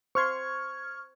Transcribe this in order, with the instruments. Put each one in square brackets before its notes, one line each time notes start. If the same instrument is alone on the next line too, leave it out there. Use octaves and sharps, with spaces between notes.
[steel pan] C5 C6 [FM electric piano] C#6 F6 G#6